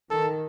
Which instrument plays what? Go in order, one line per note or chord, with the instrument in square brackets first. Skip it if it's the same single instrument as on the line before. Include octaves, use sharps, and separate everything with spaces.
[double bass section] D#3 [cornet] A4